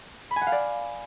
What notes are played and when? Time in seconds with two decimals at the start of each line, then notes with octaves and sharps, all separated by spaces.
0.31 B5
0.36 G#5
0.41 F#5
0.47 F5
0.52 D5